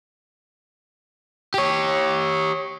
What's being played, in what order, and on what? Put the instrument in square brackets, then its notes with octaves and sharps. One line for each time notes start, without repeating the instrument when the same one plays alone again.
[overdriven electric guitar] G4 C#5